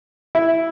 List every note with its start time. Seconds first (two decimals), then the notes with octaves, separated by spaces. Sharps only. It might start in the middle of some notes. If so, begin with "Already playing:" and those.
0.35 E4